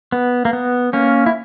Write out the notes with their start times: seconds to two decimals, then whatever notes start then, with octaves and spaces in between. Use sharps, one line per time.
0.12 B3
0.45 A#3
0.53 B3
0.93 A#3 C#4
1.26 E4